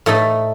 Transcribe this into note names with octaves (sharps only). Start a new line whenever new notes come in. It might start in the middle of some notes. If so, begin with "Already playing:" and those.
A2 A3 D#4 A4